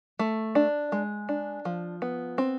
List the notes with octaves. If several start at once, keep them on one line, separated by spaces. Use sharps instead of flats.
A3
D4
G#3
D4
F3
B3
C4